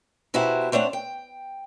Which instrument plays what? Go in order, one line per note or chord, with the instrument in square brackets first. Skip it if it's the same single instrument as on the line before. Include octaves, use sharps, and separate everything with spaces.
[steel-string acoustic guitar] B2 E4 F#4 G4 C5 A#5
A3 C4 D4 C#5 F#5
G5